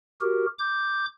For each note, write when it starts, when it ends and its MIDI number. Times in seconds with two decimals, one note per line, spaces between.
0.21 0.46 66
0.21 0.46 67
0.21 0.46 70
0.59 1.06 86
0.59 1.06 91